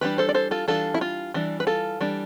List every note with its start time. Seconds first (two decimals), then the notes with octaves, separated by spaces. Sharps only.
0.01 E3 G3 D4 G4 B4
0.18 A4 C5
0.29 D5
0.35 A4 C5
0.51 F4 A4
0.68 E3 G3 D4 F4 A4
0.94 E4
1.01 F4
1.34 E3 G3 D4
1.60 B4
1.67 F4 A4
2.01 E3 G3 D4